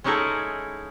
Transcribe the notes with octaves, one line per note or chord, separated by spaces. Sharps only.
G#3 C#4 D#4 E4 G#4 A4